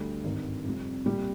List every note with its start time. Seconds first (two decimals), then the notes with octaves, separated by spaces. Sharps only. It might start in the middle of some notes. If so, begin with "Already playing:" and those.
Already playing: D2 D3 G3
0.24 G#1 G2 D#3
0.65 F2 C3 G3
1.06 C2 A#2 G3 G4